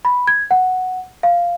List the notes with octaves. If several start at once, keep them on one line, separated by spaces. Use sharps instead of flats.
B5
G#6
F#5
F5